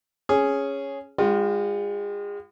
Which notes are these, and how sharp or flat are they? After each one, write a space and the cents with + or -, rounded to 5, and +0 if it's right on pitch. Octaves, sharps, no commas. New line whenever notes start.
C#4 +0 G#4 +0
G#3 -35 F4 +20 G5 -35